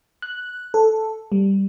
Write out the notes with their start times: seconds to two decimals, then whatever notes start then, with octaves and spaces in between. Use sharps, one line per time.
0.22 F#6
0.74 A4
1.32 G3